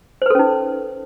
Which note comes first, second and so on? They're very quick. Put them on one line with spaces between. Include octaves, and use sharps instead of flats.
C5 B4 A4 C#4 D#4